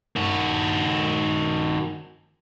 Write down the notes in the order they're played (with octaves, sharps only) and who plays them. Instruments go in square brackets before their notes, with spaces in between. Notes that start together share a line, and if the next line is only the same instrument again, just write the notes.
[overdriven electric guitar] D#3 F#4